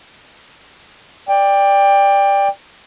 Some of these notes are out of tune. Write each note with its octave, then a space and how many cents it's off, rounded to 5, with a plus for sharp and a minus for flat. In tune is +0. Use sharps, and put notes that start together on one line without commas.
D5 +0 G5 +20